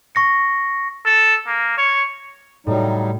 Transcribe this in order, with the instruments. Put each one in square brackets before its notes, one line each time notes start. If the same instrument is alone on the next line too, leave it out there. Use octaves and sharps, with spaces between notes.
[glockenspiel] C#6 A#6 C#7
[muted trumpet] A4
A#3
C#5
[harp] A2 [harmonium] F#3 G3 D#4